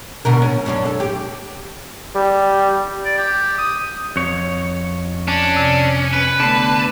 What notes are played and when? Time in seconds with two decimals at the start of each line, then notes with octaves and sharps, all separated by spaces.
0.25 B2 D3 A#4
0.42 C#4
0.66 F#2 C#4 D4
0.85 A4
1.00 G4
2.15 G3
3.05 D5
3.18 G4
3.58 D#6
4.16 F2 C#5
5.28 C#4 D4
5.57 C3
6.13 B4
6.40 D3 A3 B3 A5